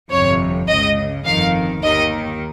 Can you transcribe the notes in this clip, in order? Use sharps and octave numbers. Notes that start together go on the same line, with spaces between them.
G1 F2 C3 C#5
C#2 C#3 D#5
G1 F2 D#3 F5
D#2 D#3 D#5